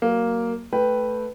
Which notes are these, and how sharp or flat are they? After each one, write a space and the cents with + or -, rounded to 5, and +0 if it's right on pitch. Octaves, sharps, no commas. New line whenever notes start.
F#3 +25 A#3 +0
A3 +0 B4 +0 G5 +0